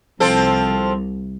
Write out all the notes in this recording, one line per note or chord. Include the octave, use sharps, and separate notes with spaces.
C2 F3 C4 A4